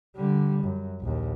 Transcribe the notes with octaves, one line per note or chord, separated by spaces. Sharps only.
D3 G3
F#2
A#1 D#2